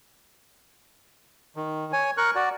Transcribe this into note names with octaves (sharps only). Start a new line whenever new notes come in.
D#3
C#5 G#5
A#4 C#6 F#6
F#4 D5